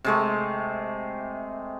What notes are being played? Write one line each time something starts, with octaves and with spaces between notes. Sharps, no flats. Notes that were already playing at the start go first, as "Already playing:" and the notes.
C3 G#3 A3